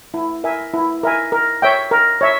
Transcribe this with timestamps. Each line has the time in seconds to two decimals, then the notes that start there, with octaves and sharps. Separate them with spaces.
0.14 E4
0.44 A#4 E5 G#5
0.73 E4
1.03 A#4 E5 G#5
1.32 A#4
1.62 C#5 E5 G5
1.91 A#4
2.21 C#5 E5